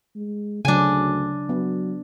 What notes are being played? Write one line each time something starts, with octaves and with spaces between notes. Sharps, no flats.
G#3
D2 C#3 F#3 D4 G#5
F#3 B3